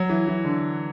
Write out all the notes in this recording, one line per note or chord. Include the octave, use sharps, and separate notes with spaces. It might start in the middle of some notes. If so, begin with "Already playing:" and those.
Already playing: F#3
E3
E3
D3